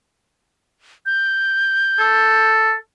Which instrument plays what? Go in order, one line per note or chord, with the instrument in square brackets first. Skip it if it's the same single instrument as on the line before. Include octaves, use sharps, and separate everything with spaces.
[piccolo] G6
[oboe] A4